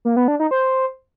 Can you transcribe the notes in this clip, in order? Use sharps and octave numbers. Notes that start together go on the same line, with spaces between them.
A#3
B3
D4
D#4
C5